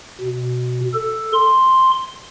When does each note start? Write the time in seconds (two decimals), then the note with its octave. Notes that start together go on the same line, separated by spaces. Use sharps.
0.21 B2
0.94 A4
1.33 C6